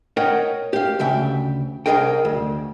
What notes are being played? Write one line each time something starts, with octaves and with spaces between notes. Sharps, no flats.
A#4 C#5 D#5 F#5 G5
G4 F5
D2 C#3 E5 G5
C2 C#3 G#4 A#4 D#5 G5
D2